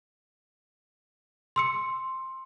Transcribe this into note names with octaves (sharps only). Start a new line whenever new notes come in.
C6 E6 C#7